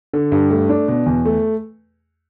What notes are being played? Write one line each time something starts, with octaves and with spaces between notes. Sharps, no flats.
D3
G2
A3
D4
B2
E2
A3